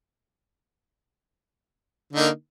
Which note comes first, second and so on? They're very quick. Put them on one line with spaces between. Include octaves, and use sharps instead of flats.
D3 D#4 A#3